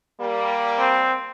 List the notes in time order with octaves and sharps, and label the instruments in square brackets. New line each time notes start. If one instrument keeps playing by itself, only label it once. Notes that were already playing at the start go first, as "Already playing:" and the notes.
[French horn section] G3 A#3
[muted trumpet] C4